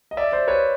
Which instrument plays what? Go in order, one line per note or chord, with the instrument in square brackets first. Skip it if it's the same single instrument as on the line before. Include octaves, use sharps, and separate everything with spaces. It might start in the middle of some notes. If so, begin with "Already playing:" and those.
[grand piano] D#5
D5 E5
C5 D5
B4 C#5